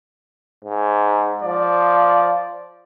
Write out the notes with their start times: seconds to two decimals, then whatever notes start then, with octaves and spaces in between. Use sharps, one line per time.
0.64 G#2
1.42 F3 D5